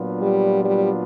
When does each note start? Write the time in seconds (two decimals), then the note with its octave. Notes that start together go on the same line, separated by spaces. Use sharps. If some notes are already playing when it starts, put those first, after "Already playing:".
Already playing: A#2 F#3 B3 D4 F4
0.21 G3
0.64 G3